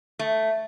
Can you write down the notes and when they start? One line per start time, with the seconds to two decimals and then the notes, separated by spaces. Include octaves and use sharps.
0.19 A3